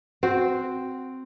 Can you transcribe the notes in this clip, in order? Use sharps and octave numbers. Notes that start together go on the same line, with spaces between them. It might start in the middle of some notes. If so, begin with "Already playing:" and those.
C4 F#4 C5